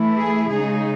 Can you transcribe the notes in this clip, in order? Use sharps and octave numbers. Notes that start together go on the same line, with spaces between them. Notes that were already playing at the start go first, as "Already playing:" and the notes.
Already playing: E3 A3 E4
G#4
C#3 G#3 D#4 G#4